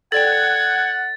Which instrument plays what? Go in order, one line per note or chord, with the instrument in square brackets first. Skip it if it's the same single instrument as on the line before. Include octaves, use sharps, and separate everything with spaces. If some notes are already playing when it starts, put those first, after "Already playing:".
[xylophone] A4 D5 G5 [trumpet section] F#5 [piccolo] G#6 [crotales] A6